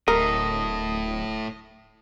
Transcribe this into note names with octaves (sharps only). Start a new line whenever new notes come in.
D1 A2 A#4 D#5